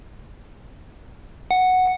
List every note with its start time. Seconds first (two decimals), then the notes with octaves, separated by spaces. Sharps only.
1.51 F#5